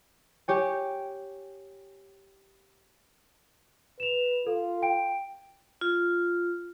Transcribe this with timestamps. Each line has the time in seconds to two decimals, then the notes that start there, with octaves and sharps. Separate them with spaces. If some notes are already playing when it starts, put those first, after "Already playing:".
0.48 G4 C#5 G#5
4.00 B4 E7 F7
4.47 F4 A4
4.82 G5 D7
5.81 F4